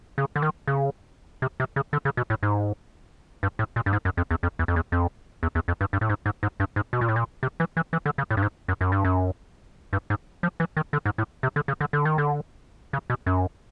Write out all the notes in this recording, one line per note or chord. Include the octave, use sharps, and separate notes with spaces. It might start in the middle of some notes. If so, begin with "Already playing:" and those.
C#3
D3
D#3
C#3
C3
C3
C#3
D3
C#3
B2
A2
G#2
G2
A2
A#2
G2
G#2
F#2
F2
E2
F2
E2
F2
E2
F2
E2
E2
F2
G2
G2
A2
G#2
G#2
G#2
G2
G#2
B2
A#2
A2
A#2
C3
E3
E3
E3
D3
C#3
A2
G2
G#2
F#2
F#2
G2
F#2
G2
G#2
F3
E3
D#3
D3
G#2
A2
C3
D3
C#3
D3
D3
D#3
D3
C#3
B2
F#2